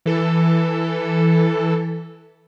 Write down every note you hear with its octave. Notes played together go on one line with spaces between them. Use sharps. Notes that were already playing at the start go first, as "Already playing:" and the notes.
E3 A4